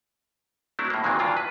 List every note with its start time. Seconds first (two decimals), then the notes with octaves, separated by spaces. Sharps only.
0.79 F#3 A3 C4 D4 E4
0.90 A2 A#3
1.04 A#2 D#3 E3 F#3 G#3 C4
1.19 G2 A#2 E3 F#3 D4 F4
1.37 B4